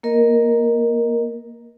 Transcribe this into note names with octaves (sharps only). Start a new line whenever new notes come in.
A#3 A#4 D#5